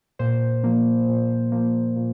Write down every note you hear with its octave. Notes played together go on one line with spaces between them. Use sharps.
A#2 C5
F3 A#3
A#2
F3 A#3
A#2